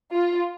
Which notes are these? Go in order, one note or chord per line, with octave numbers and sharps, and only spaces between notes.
F4